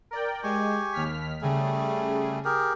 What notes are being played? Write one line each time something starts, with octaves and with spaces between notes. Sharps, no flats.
A#4 D5 G5
G#3 G4 G#5 C#6
D#2 F6 B6
C#3 G3 A3 G#4
G4 G#4 A#4